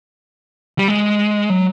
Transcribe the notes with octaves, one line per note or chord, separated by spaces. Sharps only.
G3
G#3
F#3